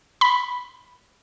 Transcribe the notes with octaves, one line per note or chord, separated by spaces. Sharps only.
B5